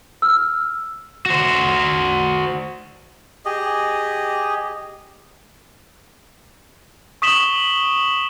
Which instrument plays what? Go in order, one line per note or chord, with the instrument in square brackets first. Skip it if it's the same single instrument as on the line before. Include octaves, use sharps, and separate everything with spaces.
[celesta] E6 F6
[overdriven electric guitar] F#4 C5
[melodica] G4 G#4 D#5
[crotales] C#6 D#6 B6 E7 F#7 G7